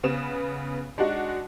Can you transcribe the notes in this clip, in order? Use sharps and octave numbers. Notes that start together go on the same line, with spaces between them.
C#3 B3 E7
G#3 D4 D#4 F#4